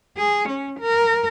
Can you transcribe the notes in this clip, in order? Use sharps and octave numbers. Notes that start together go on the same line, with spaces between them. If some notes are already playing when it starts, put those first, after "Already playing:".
G#4
C#4
A#4